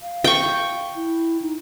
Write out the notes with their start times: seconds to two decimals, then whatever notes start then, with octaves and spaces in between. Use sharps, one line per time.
0.02 F5
0.24 G5 C#6
0.96 E4
1.42 D#4